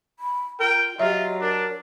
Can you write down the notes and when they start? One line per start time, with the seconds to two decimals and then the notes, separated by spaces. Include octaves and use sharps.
0.19 B5
0.60 F4 A#4 G5
0.99 F#3 F4 G4 D#5 E5
1.41 D4 A#4